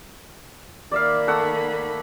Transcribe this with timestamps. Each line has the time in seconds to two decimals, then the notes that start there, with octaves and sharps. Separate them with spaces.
0.91 D#3 A#3 D5 E5 F5 B5
1.28 A3 F#5 E6